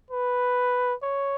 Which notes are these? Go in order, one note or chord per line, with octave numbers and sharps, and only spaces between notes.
B4
C#5